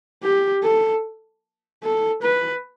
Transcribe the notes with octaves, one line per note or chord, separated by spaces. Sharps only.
G4
A4
A4
B4